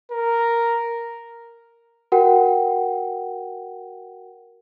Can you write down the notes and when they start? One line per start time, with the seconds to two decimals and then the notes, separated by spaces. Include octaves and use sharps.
0.12 A#4
2.12 F#4 A#4 F#5 G5